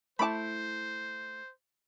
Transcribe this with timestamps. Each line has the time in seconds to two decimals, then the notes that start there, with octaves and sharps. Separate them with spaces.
0.19 A3 E4 C5 A5 B5 D6